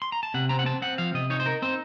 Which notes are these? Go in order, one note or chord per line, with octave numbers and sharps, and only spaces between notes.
C6
A#5
A5
C3 F#5
C4 A#5
F#5
C4 A5
C4 F#5
F3 F5
C3 D#5
D#4 C#5
C5
D#4 A#4
C4 C5